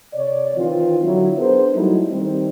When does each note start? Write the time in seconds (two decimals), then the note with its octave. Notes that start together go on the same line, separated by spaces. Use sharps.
0.14 C3 C#5 D5
0.57 D#3 E3 C4 F4
1.04 D3 F#3 E4
1.37 B3 D4 G#4 A#4 C5
1.73 F#3 G3 A3 D#4 E4
2.10 D#3 G3 C4